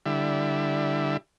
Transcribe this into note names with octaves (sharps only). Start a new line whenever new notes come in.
D3 G3 E4